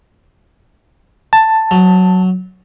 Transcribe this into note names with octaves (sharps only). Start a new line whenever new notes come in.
A5
F#3